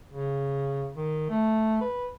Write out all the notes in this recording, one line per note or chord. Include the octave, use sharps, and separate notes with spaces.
C#3
D#3
A3
B4